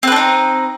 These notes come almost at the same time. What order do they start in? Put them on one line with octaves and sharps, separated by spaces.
C4 B4 D4 D#4